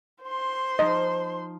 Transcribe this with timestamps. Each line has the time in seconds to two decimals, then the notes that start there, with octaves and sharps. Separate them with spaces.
0.23 C5 C6
0.79 F3 D#4 D#5